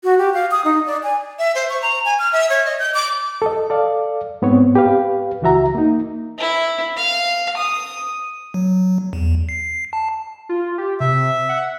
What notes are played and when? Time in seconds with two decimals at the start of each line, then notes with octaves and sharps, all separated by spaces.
0.04 F#4
0.18 G4
0.34 F5
0.51 D#6
0.65 D#4
0.86 D5
1.03 G#5
1.39 E5
1.55 C5
1.70 C#6
1.82 A#5
2.05 G#5
2.19 F6
2.33 E5
2.50 C#5
2.65 D#5
2.79 G6
2.94 D6
3.42 A4 D#5
3.70 A4 D5 F5
4.42 G#2 B3 C4 C#5
4.75 G4 B4 F5
5.42 C#2 E3 F#4 E5 A#5
5.75 A#3 D#4
6.38 E4
6.97 F5
7.56 D#6
8.54 F#3
9.13 E2
9.49 C7
9.93 A5
10.49 F4
10.78 G4
11.00 C3 E5
11.49 F#5